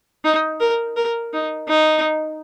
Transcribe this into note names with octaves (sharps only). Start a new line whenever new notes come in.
D#4
A#4
A#4
D#4
D#4